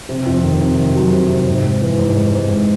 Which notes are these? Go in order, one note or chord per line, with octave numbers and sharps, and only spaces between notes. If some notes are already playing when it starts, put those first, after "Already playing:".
C3
F2
D#3
C3
D#3
F#3
C3
C3
G#2
G#2
E3
G#2
G#2
G#2